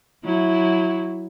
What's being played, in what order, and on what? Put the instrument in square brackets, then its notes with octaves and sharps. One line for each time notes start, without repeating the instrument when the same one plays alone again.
[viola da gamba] F#3 E4